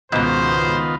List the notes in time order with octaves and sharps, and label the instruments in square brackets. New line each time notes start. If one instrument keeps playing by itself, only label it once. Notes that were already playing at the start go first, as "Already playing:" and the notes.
[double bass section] C#2 [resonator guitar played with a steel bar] G#2 B2 [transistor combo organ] D#3 B3 F4 [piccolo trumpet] C5